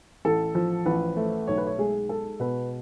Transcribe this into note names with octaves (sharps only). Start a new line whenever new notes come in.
A1 A4
F3
A1 B4
A3
B1 C#5
B4
C#5
G#3 G#4
G#3 A4
B2 B4